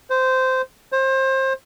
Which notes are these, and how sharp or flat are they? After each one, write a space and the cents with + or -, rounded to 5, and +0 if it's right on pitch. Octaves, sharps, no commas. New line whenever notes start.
C5 -15
C5 +25